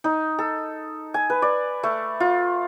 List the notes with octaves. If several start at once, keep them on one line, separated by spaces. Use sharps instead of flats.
D#4
A4
G#5
B4
D5
A3
F4